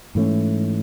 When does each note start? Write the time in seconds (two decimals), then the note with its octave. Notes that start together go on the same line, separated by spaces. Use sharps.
0.15 G#2 E3 A3 C#4